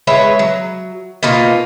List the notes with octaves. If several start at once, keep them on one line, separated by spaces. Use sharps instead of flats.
G#3 B4 C#5 E5
F#3
B2 A#3 D#4 F4